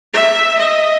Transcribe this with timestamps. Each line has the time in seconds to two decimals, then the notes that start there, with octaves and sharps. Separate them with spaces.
0.14 E5
0.58 D#5